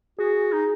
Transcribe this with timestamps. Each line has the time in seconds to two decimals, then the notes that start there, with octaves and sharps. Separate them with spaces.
0.18 F#4 G#4
0.53 D#4